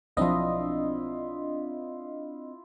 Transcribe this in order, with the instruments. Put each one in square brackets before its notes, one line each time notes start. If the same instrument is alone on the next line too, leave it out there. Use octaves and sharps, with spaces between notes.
[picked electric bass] B1 F3 [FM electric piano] C4 D4 D#5 [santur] E4 F4